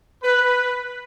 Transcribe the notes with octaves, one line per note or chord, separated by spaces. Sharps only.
B4